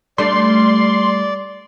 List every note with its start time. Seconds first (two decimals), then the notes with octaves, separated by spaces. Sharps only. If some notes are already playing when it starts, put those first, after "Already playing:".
0.18 G3 A3 D4 D5 C6